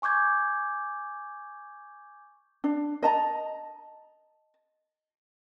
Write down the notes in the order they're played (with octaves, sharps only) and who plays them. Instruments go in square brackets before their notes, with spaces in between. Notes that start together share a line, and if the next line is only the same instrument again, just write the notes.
[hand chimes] G#5 C#6 D6 G6 G#6
[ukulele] D4
D#5 A5 A#5